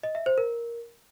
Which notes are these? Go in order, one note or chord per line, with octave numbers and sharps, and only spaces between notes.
D#5
E5
C5
A#4